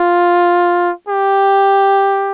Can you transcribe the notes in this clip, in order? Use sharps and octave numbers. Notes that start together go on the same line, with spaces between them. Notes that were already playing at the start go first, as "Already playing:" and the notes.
Already playing: F4
G4